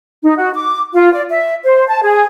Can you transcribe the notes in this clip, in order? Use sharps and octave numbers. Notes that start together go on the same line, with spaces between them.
D#4
F#4
D6
F4
D5
E5
C5
A5
G#4